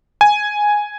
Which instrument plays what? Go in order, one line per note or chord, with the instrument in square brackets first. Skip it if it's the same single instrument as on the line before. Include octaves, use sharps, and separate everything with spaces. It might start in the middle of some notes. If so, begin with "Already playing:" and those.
[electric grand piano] G#5